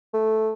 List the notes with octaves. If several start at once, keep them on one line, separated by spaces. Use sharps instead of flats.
A3